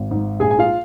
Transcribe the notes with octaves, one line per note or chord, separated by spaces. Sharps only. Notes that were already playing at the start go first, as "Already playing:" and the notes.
Already playing: G#1
G#2
A#1 G#4 G#5
G#5
F4 F5